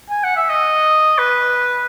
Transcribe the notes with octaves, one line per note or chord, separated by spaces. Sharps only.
G#5
F#5
E5
D#5
B4